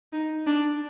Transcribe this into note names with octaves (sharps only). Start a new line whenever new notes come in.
D#4
D4